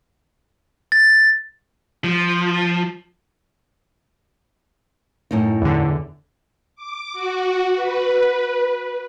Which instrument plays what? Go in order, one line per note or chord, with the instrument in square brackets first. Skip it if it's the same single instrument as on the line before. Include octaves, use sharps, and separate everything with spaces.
[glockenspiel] A6
[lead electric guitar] F3
[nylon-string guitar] F#2 A2 D#4
[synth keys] E2 D3
[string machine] D6
F#4
B4